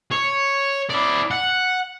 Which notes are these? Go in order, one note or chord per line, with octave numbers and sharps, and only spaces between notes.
C#5
E4 D5
F#5